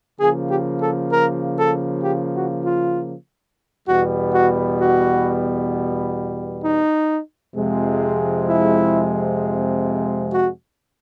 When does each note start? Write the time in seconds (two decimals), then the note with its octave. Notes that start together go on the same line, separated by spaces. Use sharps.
0.20 C#3 F3 A#3 G#4
0.50 G4
0.81 A4
1.12 A#4
1.58 A4
2.04 G4
2.35 F#4
2.65 F4
3.88 E2 B2 G3 B3 F#4
4.34 F#4
4.80 F#4
6.64 D#4
7.56 F2 C3 F3 G#3
8.47 E4
10.32 F#4